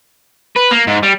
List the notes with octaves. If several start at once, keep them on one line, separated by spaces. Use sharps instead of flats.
B4
A#3
G#2
G3